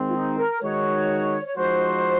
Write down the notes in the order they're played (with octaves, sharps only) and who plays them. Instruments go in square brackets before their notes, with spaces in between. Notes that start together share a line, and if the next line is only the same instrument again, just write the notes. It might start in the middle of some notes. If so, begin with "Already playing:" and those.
Already playing: [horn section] D#3 G#3 C4
[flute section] F4
D#4
A#4
[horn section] D#3 G#3 D#4 F#4 [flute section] C#5
[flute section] C#5
[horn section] F3 G#3 D#4 F#4 [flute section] C5